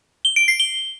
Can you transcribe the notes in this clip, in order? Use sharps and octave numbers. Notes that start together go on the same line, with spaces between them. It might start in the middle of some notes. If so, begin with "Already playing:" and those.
G7
D7
C7
G7